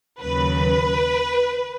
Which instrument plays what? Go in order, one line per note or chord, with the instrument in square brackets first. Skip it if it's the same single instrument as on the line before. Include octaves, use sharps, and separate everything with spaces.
[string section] D#2 C#3 F#3 B4